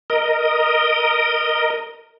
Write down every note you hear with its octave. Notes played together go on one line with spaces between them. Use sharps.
A#4 D#5